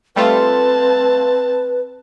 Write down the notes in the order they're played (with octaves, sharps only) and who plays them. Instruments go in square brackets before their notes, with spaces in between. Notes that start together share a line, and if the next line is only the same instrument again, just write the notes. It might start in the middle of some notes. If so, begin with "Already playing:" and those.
[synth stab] G3 A3 F4 [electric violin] C4 A5 [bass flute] B4